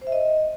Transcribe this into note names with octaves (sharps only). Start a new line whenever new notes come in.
C5
E5
D#5